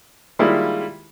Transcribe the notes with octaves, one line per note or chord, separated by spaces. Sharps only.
D#3 G3 G#3 A#3 E4 F4